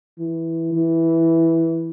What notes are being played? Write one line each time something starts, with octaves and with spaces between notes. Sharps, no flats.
E3
E3